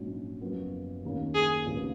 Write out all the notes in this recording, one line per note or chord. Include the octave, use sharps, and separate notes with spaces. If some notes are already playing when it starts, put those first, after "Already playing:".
Already playing: A#1 G#2 F#3 C#4
F#1 F#2 F3 B3
D#2 D#3 A#3 C#4
G#4
F1 D#2 C#3 F3 B3